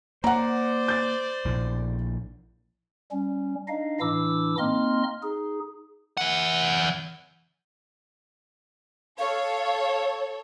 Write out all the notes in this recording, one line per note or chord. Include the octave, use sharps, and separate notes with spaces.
A#3 C5 D5 F#5 A#5
G6 A6
A#1 A2
G3 C#4
D4 D#4 D#5 F5
A2 E3 D4 E4 D6 E6
A#3 C4 D#4 D#5 C6 F6
D#4 G#4
E3 F#5
A4 C#5 F5